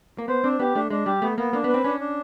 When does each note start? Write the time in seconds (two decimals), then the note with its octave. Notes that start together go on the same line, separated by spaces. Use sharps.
0.18 A#3
0.28 B3 C5
0.43 C4 D4
0.59 B3 G4
0.75 A3 D4
0.90 G#3 D4
1.06 G3 G4
1.22 A3 B3
1.37 A#3 B3
1.53 A#3 D4
1.64 B3
1.69 B4
1.74 C4
1.84 C#4 D4
2.00 D4